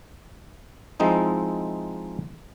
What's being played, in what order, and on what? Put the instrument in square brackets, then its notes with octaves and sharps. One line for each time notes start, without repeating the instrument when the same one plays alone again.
[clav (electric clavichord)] F3 G#3 C4 D#4 E4